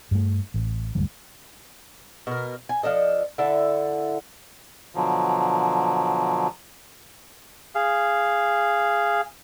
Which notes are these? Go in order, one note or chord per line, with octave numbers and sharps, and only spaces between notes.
G2 A3
A1
D2 G2 F3
B2 A#4
G#5
F3 D4 A4 D#5
D3 E4 A4 E5
B2 D3 F3 F#3
G#4 F5